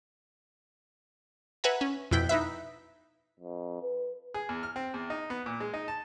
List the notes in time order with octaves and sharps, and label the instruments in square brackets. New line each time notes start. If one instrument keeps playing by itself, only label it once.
[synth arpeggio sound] B4 E5 F#5 G#5 A#5
C#4
F2 B2 E4 G5 B6
D#4 E4 B4 E5
[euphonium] F2
B4
[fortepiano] G#4
E2
F6
C4
E2
D#4
B3
A#2
G#3
D#4
A5